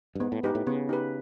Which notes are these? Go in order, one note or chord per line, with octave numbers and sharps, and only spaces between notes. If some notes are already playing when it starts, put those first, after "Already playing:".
G2
G#2 B3
A2
G#2 D#4 G4 B4
A2
C#3 B3
D#4 G4 B4